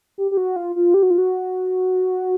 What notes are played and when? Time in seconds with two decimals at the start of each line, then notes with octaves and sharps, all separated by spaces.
0.18 G4
0.31 G4
0.37 F#4
0.56 F4
0.76 F4
0.94 G4
1.03 F#4
1.10 F4
1.18 F#4